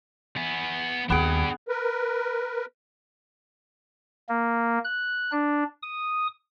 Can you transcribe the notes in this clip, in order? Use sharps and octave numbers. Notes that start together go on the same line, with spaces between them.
B3 G#4
D#2 B3 D4 G#4 G5
A#4 B4
A#3
F#6
D4
D#6